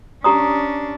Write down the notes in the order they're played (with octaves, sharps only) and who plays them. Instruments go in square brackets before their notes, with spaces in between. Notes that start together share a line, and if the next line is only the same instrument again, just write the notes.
[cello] C#4 D4 [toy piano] G4 A#5 D#6